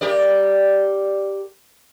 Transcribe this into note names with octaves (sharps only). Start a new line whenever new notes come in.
G4 A#4 D5